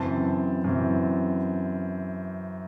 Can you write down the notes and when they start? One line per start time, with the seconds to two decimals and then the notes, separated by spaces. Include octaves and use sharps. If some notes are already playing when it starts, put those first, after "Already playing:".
Already playing: F#2 C#3 E3 C4 A5
0.64 F#2 C#3 E3 C4